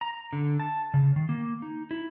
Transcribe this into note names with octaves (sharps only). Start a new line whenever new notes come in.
A#5
D3
A5
C#3
D#3
A#3
D#4
E4